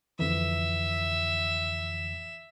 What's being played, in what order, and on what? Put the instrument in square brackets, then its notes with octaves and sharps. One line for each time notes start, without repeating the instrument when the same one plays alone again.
[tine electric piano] F2 D3 E3 [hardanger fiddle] E5